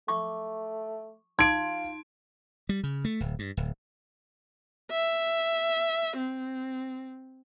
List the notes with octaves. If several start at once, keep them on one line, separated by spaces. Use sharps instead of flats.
A3 C#6 D6
D#4 F4 C6 G#6 D7
G3
C#3
A3
D1
G2
D1
E5
C4